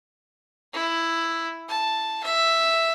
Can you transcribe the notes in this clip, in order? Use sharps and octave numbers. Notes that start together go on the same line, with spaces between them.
E4
A5
E5